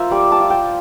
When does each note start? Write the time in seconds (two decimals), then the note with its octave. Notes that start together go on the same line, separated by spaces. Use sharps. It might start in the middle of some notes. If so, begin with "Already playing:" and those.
Already playing: F4 A#4 C5 E5
0.11 G3 D5
0.32 A5
0.41 F4
0.50 G5